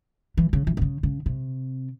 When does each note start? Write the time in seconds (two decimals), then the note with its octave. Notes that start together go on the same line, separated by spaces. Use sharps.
0.37 E3
0.53 C#3
0.67 E3
0.77 C3
0.81 C#3
1.03 C#3
1.26 C3